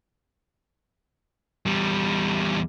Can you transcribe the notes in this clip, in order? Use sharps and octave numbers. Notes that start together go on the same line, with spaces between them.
E2 G3